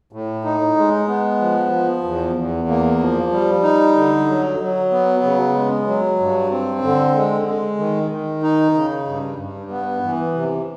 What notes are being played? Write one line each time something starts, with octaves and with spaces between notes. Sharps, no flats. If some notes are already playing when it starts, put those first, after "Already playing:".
A2
D#4
G#3
B3
F3
F3
E2
E2
A#3
F3
G3
D#4
D3
F#3
F#3
B3
C#3
G#3
F#3
G2
C4
D3
G#3
G#3
D#3
D#3
D#4
C#3
G2
G2
B3
E3
C3